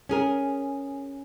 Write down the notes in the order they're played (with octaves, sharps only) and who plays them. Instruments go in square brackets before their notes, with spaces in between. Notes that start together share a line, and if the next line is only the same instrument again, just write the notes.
[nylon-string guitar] C#4 G#4 A#4